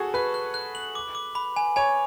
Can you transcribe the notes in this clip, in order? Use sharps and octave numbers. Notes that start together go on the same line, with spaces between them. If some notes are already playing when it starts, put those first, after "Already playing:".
Already playing: F#4 G#4 A4 C#5
B4 F#6
F#6
F#6
F#7
D6
D6
B5
G#5
C#5 G#5